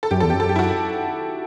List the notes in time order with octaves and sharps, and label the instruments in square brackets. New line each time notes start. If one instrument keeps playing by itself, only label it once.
[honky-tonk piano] A4
[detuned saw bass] F#2 [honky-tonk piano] G4
[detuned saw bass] E2 [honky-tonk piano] A4
[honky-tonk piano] G4
[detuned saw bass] F#2
[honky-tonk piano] A4
G4
E4
F#4